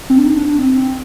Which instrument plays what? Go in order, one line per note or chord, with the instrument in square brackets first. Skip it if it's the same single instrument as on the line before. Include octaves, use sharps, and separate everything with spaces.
[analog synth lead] C4
D4
D#4
D4
D4
C4